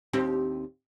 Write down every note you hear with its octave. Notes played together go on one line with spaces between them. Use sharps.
D#2 C4 G4